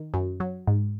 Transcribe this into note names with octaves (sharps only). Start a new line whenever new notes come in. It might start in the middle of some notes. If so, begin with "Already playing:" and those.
Already playing: D#3
F#2
F#3
G#2